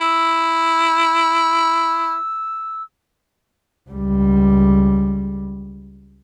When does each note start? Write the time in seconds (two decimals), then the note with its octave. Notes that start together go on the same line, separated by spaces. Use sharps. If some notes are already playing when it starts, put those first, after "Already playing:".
0.01 E4 E6
3.90 C#2 G3